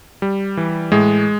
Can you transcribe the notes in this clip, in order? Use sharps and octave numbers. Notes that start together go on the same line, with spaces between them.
G3
E3
A2 G#3